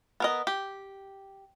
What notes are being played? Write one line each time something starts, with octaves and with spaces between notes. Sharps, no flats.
B3 A#4 D#5
G4